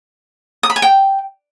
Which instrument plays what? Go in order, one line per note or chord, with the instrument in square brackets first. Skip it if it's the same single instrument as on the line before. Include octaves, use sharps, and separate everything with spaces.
[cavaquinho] D#6
B5
G#5
G5